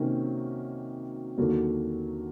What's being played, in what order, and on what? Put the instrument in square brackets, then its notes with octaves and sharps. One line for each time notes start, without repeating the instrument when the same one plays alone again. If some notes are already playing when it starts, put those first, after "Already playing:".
Already playing: [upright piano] C3 D#3 F#3 A#3 C#4
D#2 D3 F#3 A#3